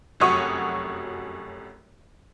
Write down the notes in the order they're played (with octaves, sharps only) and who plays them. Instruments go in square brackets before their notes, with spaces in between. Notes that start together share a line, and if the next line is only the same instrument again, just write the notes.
[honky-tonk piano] F1 F#2 F#4 C#5 D#6 C#7